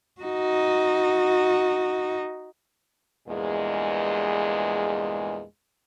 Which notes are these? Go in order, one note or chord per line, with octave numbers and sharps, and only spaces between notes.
D#4 F#4
E2 G2 A#2 G#3